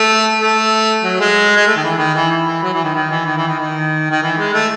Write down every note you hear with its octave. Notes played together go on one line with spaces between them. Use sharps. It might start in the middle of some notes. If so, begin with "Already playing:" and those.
Already playing: A3
A3
F#3
G#3
G#3
A3
D#3
E3
D#3
E3
E3
E3
F#3
E3
D#3
D#3
E3
D#3
E3
D#3
D#3
D#3
E3
G#3
A3